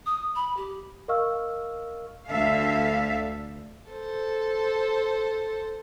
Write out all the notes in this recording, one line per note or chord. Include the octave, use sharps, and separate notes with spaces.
D#6
B5
G4
A#4 D#5 F5 C#6 E6 F6
D2 D3 A4 E5 F5
A4 C5